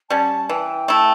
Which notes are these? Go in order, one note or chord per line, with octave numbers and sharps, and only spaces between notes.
G3 C#4 A5
E3 G5
A3 E4